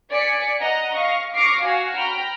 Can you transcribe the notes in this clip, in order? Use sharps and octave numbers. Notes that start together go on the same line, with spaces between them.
D5 G#5 B6 C#7
D#5 F#5 A#5
F5 C#6 A#6
C#6 D6 F6 A#6 C7 D7
F#4 F5 G#5
G5 A#5 B5 F6